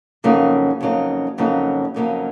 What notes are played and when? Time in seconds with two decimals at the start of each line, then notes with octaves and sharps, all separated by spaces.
0.24 F2 C#3 F#3 A#3 D#4
0.81 F2 C#3 F#3 A#3 D#4
1.38 F2 C#3 F#3 A#3 D#4
1.94 F2 C#3 F#3 A#3 D#4